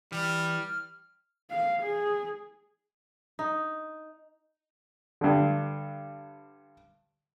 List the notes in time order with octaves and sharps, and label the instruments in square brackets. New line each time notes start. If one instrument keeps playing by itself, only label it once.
[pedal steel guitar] E3 [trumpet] G3 [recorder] F6
[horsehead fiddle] F5
G#4
[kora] D#4
[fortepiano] G2 D3